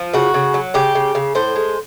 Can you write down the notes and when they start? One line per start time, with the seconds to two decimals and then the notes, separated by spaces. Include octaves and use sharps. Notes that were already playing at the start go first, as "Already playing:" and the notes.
Already playing: F3
0.14 C#3 F#4
0.34 C#3
0.54 F#3
0.74 C#3 G4
0.95 C#3
1.15 C#3
1.35 A2 C5
1.56 G#3